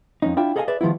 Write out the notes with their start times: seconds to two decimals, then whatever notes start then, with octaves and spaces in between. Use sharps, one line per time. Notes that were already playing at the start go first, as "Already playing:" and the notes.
0.22 F2 C#4 D#4
0.37 D4 E4 F4 G5
0.56 G#4 A4 D#5 F5 G5 G#5
0.68 G#4 B4 D5 E5
0.81 D#3 F3 G3 B3 E4